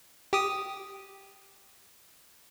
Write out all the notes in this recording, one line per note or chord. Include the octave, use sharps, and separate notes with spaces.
G4 D#6